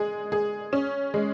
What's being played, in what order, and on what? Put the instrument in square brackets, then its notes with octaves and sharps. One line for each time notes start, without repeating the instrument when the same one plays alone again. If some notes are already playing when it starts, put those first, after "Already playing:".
Already playing: [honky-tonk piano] G#3 G#4
G#4
C#4
G#3